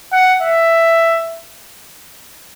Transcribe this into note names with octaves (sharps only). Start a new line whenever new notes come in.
F#5
E5